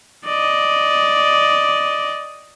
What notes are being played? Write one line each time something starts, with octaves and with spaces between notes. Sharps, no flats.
D5 D#5